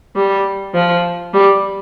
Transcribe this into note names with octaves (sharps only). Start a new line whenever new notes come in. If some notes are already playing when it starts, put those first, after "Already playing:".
G3
F3
G3